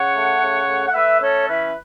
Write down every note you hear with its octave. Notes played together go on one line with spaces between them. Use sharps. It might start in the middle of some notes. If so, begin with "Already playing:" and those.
Already playing: C#3 C#5 F#5
A3
C#3
A3
F#5
A3 B4 E5
C#4 A4 C#5
E3 B4 E5